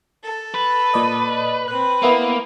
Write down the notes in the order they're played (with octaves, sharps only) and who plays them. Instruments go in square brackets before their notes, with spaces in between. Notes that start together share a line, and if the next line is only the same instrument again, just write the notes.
[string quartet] A4
[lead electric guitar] B4
[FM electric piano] A#2 D5 D#5
[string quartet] C4 B4 [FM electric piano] F#6
[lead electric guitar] A#3 [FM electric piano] B3 E4 A#4